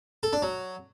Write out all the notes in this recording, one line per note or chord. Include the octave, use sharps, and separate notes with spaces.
A4
D4
F#3